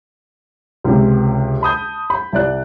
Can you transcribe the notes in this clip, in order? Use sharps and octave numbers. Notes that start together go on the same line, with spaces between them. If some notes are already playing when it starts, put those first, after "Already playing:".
C#2 C3
A5 B5 D#6 G6
B5
C2 D5 F#6